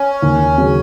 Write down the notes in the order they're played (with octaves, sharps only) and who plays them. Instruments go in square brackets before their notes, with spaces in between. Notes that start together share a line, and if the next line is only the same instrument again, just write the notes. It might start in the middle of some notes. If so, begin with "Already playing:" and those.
Already playing: [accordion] C#4
[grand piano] D#2
C#3 F#3